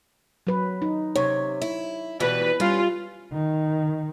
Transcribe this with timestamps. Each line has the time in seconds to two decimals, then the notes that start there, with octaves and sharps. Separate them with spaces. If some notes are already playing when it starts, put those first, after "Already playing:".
0.47 F#3 B4
0.82 D#4
1.16 C3 C#5
1.62 E4
2.20 B2 E3 G3 B4
2.60 G3 C#4 F4
3.32 D#3